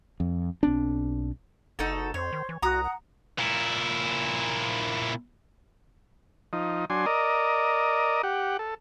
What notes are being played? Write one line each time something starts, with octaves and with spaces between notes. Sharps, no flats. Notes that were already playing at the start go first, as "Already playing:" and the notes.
F2
B1 C4 D4
F#1 D#4 F#4 A4
F2 C5 C#5
D#3
E3
C2 F#4 A#5 D#6
F#5
A#2 E4
F3 D#4
F#3 D4 G#5 C6
A#4 D5 D#5
G4 F#5
A4